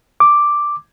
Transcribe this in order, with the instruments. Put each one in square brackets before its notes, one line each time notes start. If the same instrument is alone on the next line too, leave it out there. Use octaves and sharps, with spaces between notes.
[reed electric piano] D6